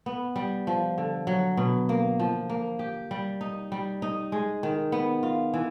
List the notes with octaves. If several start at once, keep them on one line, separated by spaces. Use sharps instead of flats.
B3
G3
F3
D3
F#3
B2
A#3
F3
A#3
G4
G3
D#4
G3
D#4
G#3
D#3
B3
F4
E3